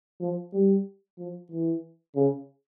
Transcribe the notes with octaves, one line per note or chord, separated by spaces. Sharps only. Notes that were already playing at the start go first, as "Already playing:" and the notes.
F3
G3
F3
E3
C#3